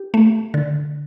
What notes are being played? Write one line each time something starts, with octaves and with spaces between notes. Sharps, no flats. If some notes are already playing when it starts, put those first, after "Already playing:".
Already playing: G4
A3
D3